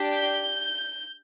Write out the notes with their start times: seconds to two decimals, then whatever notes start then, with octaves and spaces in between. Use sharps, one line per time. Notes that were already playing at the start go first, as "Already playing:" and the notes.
Already playing: D4 G4
0.14 G6